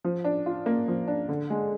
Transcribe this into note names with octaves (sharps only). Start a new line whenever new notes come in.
F3
D4
F4
A#3
F3
D4
D3
G#3